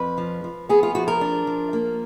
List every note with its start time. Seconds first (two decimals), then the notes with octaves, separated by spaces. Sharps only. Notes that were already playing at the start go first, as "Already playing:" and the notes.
Already playing: F2 B4
0.18 F3
0.44 F3
0.69 B3 G#4
0.83 F4
0.95 F3 F#4
1.08 A#4
1.21 D4
1.47 F3
1.73 A#3